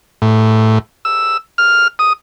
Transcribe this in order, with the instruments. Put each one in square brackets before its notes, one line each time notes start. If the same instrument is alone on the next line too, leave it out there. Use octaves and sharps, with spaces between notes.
[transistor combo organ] A2
E6
F6
D#6